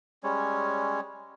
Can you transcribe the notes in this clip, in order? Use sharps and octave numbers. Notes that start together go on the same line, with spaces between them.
G3 G#3 C#4 C#5